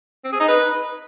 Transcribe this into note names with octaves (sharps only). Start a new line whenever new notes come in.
C4
G#4
D#4
B4